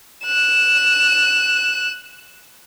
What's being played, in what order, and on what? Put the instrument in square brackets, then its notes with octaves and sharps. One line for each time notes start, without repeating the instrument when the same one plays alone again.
[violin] F#6 E7